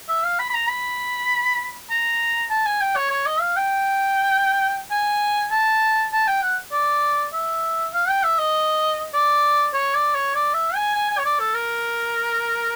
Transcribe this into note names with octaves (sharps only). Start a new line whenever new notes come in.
E5
F5
B5
B5
A#5
B5
A#5
A5
G#5
G5
C#5
C#5
D#5
F5
G5
G#5
A5
A5
G5
F#5
D5
E5
F5
G5
E5
D#5
D5
C#5
D5
C#5
D5
E5
G#5
G#5
G#5
C#5
D5
A4
A#4